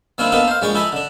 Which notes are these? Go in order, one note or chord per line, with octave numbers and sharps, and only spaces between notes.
D#3 A#3 C4 D4 E4
A#3 B3 D4 D#4 A4
C5 F5
A#1 G#3 D5 G5 A#5 C#6
D#4 E4 A4 G#5 B5
D3 D4